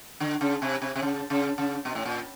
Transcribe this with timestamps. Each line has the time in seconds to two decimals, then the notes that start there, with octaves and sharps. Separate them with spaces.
0.20 D3
0.41 C#3
0.62 C3
0.82 C3
0.96 C3
1.03 C#3
1.30 C#3
1.58 C#3
1.85 B2
1.95 A2
2.05 A#2